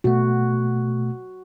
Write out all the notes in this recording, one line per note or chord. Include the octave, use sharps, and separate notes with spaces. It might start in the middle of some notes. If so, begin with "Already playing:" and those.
B2 A3 F#4